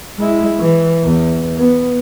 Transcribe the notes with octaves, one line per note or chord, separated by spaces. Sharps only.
G#3 E4
E3
E2
B3